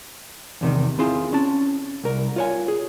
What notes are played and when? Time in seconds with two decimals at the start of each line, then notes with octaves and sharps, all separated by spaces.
0.61 E2 C3 D#3
0.99 C4 E4 F4 G#4 C6
1.33 C#4 A5
2.04 C2 A#4
2.36 F4 C#5 G#5
2.68 G#4